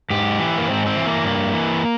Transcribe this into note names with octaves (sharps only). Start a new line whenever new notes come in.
G#2 G4
E3
A#3
G#2 C4
C4
E3
A#3
G2
E3